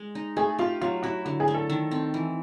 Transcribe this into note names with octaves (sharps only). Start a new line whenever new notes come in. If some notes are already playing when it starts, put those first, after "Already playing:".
Already playing: G#3
D#4
A3 G#4
F4 G4
F#3 F4
E4 F#4
D3 F#4
G#4
A3
A4
D#3
C4
E3